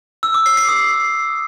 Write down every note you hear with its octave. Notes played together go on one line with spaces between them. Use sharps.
E6
D6
C7
C7
D#6